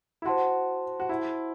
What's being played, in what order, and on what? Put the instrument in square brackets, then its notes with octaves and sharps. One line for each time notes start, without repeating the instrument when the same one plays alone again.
[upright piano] E4
[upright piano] F#4 [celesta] C5 F#5 A5 C6
[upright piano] F#4
E4